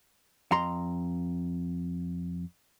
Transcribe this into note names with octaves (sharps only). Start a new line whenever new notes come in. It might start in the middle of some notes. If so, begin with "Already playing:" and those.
F2 A#5 C6